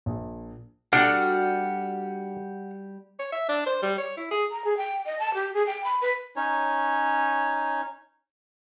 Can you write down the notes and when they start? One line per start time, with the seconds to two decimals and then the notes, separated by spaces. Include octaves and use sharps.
0.06 A#1
0.93 G3 D4 F#4 A4 F#5 G5 F6
3.19 C#5
3.32 E5
3.49 D4
3.66 C5
3.82 G3
3.98 C#5
4.17 E4
4.31 G#4
4.50 A#5
4.65 G#4
4.77 G5
5.06 D#5
5.19 A5
5.34 G4
5.54 G#4
5.67 G5
5.84 B5
6.02 B4
6.36 C#4 D#4 C#5